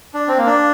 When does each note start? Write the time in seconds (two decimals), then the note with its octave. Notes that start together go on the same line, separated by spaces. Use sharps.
0.14 D4
0.28 C4
0.38 A#3
0.47 D4